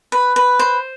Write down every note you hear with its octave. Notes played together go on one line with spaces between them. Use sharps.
B4
B4
C5